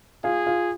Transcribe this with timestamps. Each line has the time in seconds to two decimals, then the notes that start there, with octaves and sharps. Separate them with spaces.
0.24 F4 G#4 F5
0.46 F4 F5